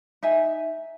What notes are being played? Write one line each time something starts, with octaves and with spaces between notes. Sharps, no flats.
D#4 E5 G#5